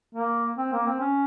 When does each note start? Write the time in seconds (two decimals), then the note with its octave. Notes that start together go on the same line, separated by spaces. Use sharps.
0.15 A#3
0.58 C4
0.72 A#3
0.87 C4
1.00 C#4